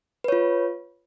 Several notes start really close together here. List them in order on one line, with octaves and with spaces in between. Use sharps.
B4 C#5 F4